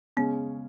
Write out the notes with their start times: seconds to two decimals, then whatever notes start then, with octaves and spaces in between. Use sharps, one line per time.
0.17 C#3 G#3 B3 C#4